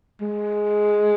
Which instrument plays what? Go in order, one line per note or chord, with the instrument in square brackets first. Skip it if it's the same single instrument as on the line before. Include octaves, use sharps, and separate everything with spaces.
[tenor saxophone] G#3